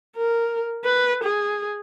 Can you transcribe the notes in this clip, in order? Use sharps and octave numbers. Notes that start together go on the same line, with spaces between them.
A#4
B4
G#4